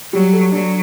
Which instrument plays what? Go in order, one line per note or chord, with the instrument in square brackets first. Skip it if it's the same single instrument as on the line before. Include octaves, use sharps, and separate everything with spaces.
[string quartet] F#3 [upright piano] G3
[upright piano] A4
[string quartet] F#3 [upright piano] D4